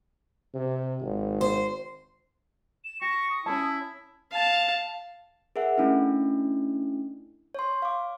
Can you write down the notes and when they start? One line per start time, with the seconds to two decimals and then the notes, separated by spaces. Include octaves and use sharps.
0.54 C3
1.01 G#1
1.41 C5
2.84 E7
3.01 G4 C#6 A#6
3.30 D#6
3.46 C#4 E4 A#4 A5
4.31 F5 A5
5.56 G#4 A#4 E5 F#5
5.78 A3 C#4 D4 E4
7.55 C#5 C6
7.82 F5 D6